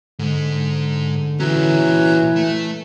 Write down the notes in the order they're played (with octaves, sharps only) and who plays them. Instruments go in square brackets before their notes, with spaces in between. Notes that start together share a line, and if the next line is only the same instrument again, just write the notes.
[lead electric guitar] G#2 G#3 [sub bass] D3
[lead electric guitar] A#2 C#4 [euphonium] E3 [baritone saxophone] F#3
[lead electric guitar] A3